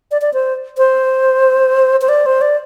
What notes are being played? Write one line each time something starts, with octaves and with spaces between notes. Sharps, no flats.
D5
D5
C5
C5
C5
D5
C5
D5